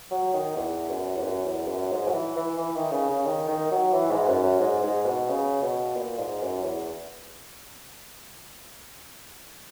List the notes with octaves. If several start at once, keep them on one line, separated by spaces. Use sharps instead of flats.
F#3
D#3
E2
F#2
E2
F#2
E2
F#2
G#2
F#3
E3
E3
E3
D#3
C#3
C#3
D#3
D#3
F#3
E3
G#2
F#2
F#2
G#2
G#2
B2
C#3
B2
A#2
G#2
F#2
E2